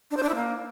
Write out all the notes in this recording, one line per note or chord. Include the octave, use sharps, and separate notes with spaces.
D4
C5
D4
E4
A#3